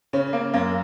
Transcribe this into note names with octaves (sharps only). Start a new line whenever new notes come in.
C#3 C#4
A#3
F#2 A#3